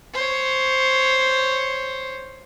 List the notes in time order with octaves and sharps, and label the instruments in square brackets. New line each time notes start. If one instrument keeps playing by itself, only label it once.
[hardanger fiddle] C5 C#5